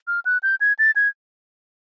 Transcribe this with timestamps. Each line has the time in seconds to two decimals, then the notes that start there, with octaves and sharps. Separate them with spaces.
0.07 F6
0.25 F#6
0.43 G6
0.60 G#6
0.79 A6
0.96 G#6